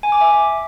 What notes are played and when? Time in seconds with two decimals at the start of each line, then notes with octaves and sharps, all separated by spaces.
0.03 G#5
0.12 D6
0.21 E5